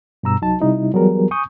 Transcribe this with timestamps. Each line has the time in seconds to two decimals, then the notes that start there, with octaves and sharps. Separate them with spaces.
0.23 G2 B2 A#5 E6
0.42 C2 F#3 D#4 A5
0.60 C3 G3 D#4 E4
0.93 E3 F#3 G3 B3 G#4 A#4
1.31 G#5 C#6 D#6 G6